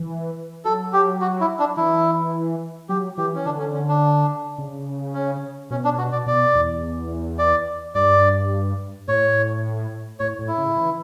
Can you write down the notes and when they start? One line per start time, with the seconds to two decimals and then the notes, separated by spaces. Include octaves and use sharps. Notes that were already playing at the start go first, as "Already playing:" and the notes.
Already playing: E3
0.65 F#3 A4
0.93 G4
1.22 F#4
1.40 E4
1.59 D4
1.77 E3 E4
2.89 F#3 G4
3.18 E3 G4
3.35 C#4
3.45 D3 D4
3.59 C#4
3.74 C#4
3.89 D4
4.58 C#3
5.14 C#4
5.70 B2 C#4
5.85 D4
5.98 F#4
6.13 D5
6.26 B2 D5
6.55 E2
7.39 D5
7.95 G2 D5
9.08 A2 C#5
10.20 A2 C#5
10.39 A2
10.48 E4
10.57 C#3
10.76 E3